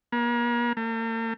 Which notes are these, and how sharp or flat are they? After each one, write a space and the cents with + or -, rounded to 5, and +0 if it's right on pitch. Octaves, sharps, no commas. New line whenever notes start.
A#3 +40
A#3 -45